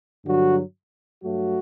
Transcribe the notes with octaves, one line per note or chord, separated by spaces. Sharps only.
G2 D3 F#3 F#4
G2 F#3 A3 F#4